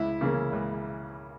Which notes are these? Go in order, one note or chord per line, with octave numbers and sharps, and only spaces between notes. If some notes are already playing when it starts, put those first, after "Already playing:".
Already playing: C#2 E4
C#3 E3 A#3
C#2